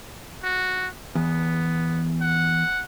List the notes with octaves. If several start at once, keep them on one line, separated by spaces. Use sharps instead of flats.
F#4
E2 B3
F#5